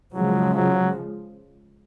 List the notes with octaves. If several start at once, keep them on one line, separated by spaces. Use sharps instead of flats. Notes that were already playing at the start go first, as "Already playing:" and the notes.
C#3 F3 F#3 G#3
F#3